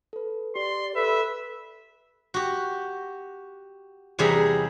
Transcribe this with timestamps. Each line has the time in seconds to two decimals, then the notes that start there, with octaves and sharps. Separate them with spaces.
0.13 A4 B4
0.56 G4 D5 C6
0.95 A4 B4 E5
2.34 F#4 G4
4.19 E2 C3 G3 G#4 E5 A#5